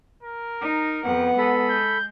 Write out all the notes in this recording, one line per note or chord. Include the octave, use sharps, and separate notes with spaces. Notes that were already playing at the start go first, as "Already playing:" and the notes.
A#4
D#4
F2 B3 F#5
G#3 A4 B5
G6